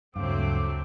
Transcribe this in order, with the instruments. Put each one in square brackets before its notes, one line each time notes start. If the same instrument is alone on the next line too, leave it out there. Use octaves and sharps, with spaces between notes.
[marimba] D2 C#3 F5 [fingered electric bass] G2 [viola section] F#3 A3 C4 [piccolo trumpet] D6